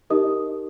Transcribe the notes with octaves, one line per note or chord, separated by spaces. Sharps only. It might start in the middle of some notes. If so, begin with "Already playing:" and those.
D#4 G4 A#4 D#5 D#6